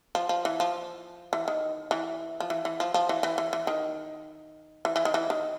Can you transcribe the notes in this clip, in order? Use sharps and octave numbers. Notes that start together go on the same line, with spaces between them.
F3
F3
E3
F3
E3
D#3
E3
F3
E3
E3
F3
F3
E3
E3
E3
E3
D#3
E3
E3
D#3
E3
D#3